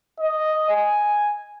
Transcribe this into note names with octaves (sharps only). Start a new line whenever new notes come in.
D#5
G#5